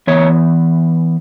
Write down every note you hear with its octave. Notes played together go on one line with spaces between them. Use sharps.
E3 B3 C#5